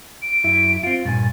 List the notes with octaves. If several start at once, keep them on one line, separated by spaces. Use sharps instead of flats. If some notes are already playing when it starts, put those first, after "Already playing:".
D7
F#2 E4 E5
C4 F4
G2 A#2 G#5 A6